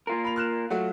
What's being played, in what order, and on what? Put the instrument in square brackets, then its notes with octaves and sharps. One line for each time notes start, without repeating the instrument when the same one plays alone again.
[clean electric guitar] A#3 F4 A#4
[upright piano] B5 F7
F6 F#6 E7
[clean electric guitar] F#3 [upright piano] A3 F4 F#4